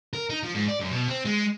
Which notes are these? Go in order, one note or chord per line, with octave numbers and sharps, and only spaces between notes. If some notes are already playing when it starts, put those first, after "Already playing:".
A#4
D#4
F3
G#2
D5
F#2
B2
C4
G#3